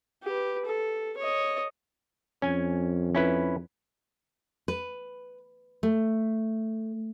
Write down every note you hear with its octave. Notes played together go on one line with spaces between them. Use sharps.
G4 B4
A4
C#5 D#5
F2 C#4 G#5
C#4 E4 B4
B4
A3